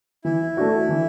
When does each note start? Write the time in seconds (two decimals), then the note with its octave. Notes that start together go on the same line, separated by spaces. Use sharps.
0.25 E3 E4
0.57 A3 D4 F#4
0.89 E3